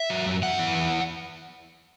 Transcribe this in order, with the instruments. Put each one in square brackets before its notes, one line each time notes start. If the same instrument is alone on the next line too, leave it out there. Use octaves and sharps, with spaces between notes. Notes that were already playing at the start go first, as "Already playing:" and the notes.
Already playing: [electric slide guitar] E5
F#3
F#2
E2 F#5
E3
E2